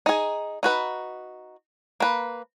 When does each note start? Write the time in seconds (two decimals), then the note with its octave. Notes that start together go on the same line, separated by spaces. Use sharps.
0.06 D#4 G#4
0.63 D#4 F#4 B4
2.00 A#3 B4